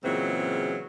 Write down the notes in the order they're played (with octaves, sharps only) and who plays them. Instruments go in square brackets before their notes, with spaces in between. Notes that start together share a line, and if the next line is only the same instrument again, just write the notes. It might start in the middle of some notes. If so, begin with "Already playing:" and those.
[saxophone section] A#2 C#3 E3 F#3 G#3 C4